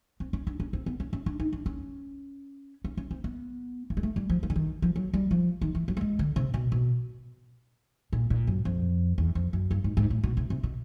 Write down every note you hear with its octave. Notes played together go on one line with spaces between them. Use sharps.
C4
C#4
D4
C#4
C4
B3
C#4
C#4
D4
D#4
D4
C#4
C#4
C#4
C4
B3
A#3
G#3
A3
G3
F3
F3
D3
D#3
F3
F#3
G3
F3
D#3
E3
F#3
A3
G#3
D3
C3
B2
B2
A#2
A#2
F#2
F2
E2
F2
F#2
G2
G#2
G#2
A2
B2
C3
C3
B2